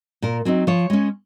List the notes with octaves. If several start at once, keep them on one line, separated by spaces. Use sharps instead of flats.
A#2 A#4
F#3 C4 D#4
F3 C#5
G#3 C#4